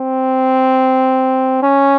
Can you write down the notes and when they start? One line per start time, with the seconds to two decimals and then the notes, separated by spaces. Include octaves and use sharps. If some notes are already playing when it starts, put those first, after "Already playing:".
Already playing: C4
1.63 C#4